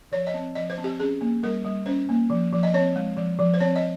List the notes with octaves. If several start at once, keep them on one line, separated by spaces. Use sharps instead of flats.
F3 C#5
D#5
C4
F3 D#5
C5
C4
G4
C#4 G#4
A#3
G3 A#4
G3
C#4 C5
A#3
F3
F3
D#5
C4 C#5
G#3
F3
F3
C5
C4 C#5
D#5